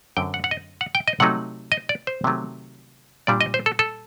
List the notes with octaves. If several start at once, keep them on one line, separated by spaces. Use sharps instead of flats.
F#2 D3 F#3 C4 G5
F#5
F#5
D#5
F#5
G5
D#5
C3 F#3 A3 D#4 F#5
D#5
D5
C5
C3 D#3 F#3 A3
A#2 G3 D4 D5
D#5
C5
A4
A4